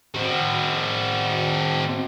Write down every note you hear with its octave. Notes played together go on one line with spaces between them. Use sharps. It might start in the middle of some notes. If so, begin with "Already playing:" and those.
C4 F#4